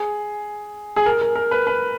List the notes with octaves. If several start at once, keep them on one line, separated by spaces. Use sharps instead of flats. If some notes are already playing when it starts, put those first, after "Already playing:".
Already playing: G#4
G#4
A#4
A#4
A#4
B4
B4